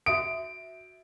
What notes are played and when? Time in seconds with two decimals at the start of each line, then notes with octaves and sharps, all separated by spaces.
0.06 F#4 E5 D#6 D7